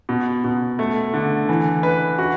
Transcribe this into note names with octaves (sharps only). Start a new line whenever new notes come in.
B2
B2
A3
D3
E3
B4
F#4